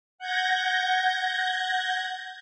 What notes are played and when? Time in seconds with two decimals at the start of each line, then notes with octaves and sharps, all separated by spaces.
0.19 F#5 G6 G#6 A#6